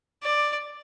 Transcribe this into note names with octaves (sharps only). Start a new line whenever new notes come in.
D5